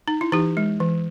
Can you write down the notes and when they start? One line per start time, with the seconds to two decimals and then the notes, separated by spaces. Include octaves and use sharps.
0.08 D#4
0.21 E4
0.32 E3 D#4 G4
0.57 G#3
0.80 E3